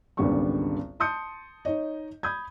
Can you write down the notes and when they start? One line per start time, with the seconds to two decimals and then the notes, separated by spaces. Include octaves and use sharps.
0.17 G#1 C#2 D3 G3 B3 C#6
1.00 A5 C6 D#6 G6 C#7
1.65 D#4 C#5 D#5
2.23 B5 D#6 G6 G#6